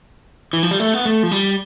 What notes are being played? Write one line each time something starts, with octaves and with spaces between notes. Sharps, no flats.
E3
F3
G3
A3
B3
A3
F3
G3